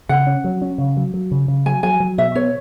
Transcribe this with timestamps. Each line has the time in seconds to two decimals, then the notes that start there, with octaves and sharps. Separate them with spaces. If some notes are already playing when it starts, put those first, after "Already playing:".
0.09 C#3 F#5
0.27 C#4
0.44 F#3
0.62 C#4
0.78 C#3
0.97 F#3
1.14 F#3
1.32 C#3
1.48 C#3
1.66 F#3 G#5
1.83 F#3 G#5
2.00 F#3
2.18 B2 E5
2.35 B3 C#5